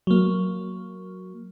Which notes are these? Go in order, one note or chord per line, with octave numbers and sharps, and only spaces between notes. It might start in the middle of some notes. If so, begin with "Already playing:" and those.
F#3 A#3